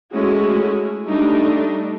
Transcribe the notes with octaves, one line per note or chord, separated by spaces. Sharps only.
G#3 A3 C#4 E4 F#4 G#4
G3 A3 D4 D#4